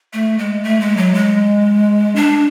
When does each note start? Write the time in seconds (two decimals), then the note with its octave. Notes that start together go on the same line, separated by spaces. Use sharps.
0.13 A3
0.39 G#3
0.63 A3
0.81 G#3
0.97 F#3
1.14 G#3
2.16 D4